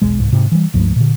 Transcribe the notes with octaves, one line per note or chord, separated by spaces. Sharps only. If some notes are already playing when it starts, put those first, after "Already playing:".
E1 B1 G#3
C2 G#2
G#2 C3
E3 G3
C#2 G2 F3 A3
A#2 D3